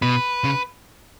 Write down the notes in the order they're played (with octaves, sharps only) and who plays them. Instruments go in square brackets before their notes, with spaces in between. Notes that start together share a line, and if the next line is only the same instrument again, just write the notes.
[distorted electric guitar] B2 [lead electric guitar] B4
[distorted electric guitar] C#3